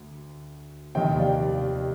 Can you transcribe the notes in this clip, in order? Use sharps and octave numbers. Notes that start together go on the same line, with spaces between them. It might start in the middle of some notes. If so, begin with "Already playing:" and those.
Already playing: D2 D3
F1 D#2 D#3 D#5 G5
D5 F5